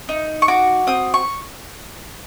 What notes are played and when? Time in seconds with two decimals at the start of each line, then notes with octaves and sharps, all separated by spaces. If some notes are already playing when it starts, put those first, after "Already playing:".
0.09 D#4
0.42 C#6
0.48 F#4 D6
0.87 C4 D#6
1.14 C#6